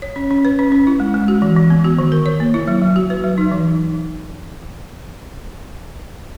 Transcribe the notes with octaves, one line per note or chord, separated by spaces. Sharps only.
C#5
C#4
C#4
B4
C#4
C#4
E4
G#3
G#3
F#4
E3
E3
B3
F#4
D#3
A#4
C#5
A#3
E4
F#3
F#3
F#4
B4
F#3
D#4
E3